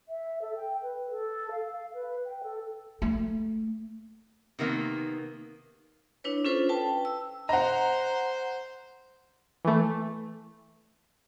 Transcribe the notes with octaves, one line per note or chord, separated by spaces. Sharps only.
E5
A4
G5
B4
A4
F5
F5
B4
G5
A4
A3
C3 D#3 A#3 B3
D4 E4 B4 C#5
C#4 F4 A4 B4 C5
B4 G5 A5
E6
C5 D#5 F#5 A#5
E3 A3